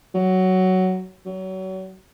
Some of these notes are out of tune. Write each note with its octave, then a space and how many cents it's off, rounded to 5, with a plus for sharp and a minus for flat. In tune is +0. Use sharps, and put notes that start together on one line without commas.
F#3 +10
F#3 +30